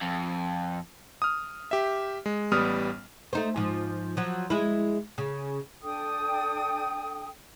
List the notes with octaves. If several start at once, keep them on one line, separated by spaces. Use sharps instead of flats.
F2
D#6 F6
G4 E5
G#3
A1 G3 B3 D#6 F6
A3 D#4 C5
G#2 F3
F3 F#3
G#3 E4
C#3
D4 A4 G5 D#6